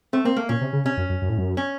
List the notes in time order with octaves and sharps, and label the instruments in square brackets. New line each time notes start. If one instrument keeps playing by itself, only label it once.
[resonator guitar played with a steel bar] A3 [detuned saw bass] C4
[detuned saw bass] A#3 [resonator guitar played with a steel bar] C4
[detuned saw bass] A3 [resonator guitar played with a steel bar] A#3
[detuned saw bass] A#2 [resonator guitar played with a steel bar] C#4
[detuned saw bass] C3
C#3
[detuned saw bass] C3 [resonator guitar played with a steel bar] C#4
[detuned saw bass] F#2
F#2
F#2
A2
F#2
[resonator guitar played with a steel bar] C#4